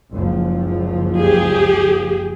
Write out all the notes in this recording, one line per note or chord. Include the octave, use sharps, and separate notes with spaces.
F#1 C#2 F3
G4 G#4